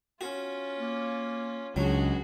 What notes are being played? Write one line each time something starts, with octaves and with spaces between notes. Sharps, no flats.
C#4 F4 F#4
A#3
C#2 F#3 D4 F#4 G#4